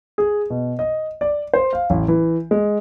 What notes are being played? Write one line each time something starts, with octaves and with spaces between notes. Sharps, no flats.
G#4
B2
D#5
D5
C5
F5
A1
E3
G#3